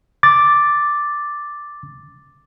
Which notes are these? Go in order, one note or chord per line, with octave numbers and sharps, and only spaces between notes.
D6 A6